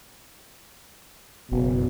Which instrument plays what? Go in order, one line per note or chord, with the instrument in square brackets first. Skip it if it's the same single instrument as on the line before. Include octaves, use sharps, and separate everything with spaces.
[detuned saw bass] F#1 [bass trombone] B2